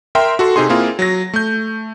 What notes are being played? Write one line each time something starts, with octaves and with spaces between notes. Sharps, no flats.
A#4 E5 G5 C6
F#4 A4 C6
C3 C4 D#4 G#4 C6
A#3 C4 E4 F4 G#4 A#4
F#3 A#6
A3 G6